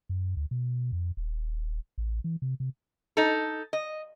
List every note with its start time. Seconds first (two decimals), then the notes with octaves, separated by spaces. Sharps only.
0.09 F#2
0.37 D2
0.51 B2
0.92 F2
1.17 D#1
1.98 A1
2.24 E3
2.42 C3
2.60 C3
3.17 D#4 A4
3.73 D#5